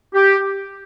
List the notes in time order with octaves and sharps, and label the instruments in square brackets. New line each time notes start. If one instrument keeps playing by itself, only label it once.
[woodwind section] G4